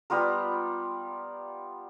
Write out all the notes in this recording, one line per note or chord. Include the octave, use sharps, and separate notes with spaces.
G3 B3 F4 A#4